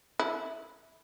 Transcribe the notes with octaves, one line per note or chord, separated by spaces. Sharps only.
E4